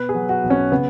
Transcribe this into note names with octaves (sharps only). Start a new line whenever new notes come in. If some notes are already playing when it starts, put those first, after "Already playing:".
Already playing: B2 B4
G#4
F#3
F#4
B1
C#4
C#3 B3